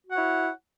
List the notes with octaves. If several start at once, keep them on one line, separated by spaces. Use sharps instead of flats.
E4 F#4 C#5 F#5